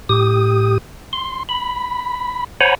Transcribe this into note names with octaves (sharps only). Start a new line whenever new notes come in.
A2 G4 D#6
C6
B5
C5 C#5 F#5 G#5 A#5 B5